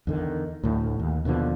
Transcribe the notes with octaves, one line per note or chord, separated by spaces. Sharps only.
E2 D3 D#3
D2 A2
D#2
D#2 B2 D3 F3